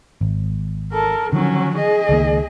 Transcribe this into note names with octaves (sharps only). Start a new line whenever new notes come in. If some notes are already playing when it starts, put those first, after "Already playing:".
G#1
A4 A#4
D3 D#3 F3 F#3 C#4
G#4 D#5
C#2 D#3 A#3